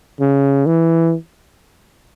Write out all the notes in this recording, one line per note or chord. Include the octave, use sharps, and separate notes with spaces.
C#3
E3